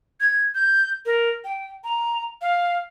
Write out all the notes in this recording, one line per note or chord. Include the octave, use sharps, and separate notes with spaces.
G#6
G6
A#4
G5
A#5
F5